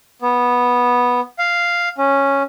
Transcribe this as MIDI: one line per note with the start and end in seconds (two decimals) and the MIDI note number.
0.22 1.20 59
1.39 1.89 77
1.98 2.42 61